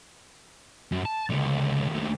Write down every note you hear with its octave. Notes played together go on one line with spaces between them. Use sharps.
F#2
A5
C#2 D3
D#2 A3